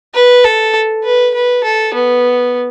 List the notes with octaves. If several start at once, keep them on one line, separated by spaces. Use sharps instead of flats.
B4
A4
B4
B4
A4
B3